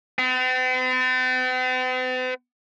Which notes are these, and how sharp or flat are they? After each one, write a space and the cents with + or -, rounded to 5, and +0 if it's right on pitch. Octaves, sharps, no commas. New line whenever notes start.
C4 -45